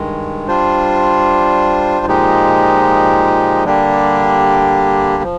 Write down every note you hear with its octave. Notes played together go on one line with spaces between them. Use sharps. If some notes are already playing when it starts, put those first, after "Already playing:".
Already playing: G2 D#3 G#3
G3 D4 F4 C5
A#2 F3 G#3 D#4 G4
D3 G3 A#3 D4 G4
F3